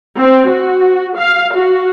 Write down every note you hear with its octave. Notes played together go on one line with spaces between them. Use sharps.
C4
F#4
F5
F#4